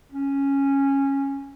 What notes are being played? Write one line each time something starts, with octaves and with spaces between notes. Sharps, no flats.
C#4